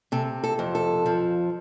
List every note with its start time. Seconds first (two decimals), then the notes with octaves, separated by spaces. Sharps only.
0.12 C3 A4
0.44 A4
0.59 F2
0.75 A4
1.06 F3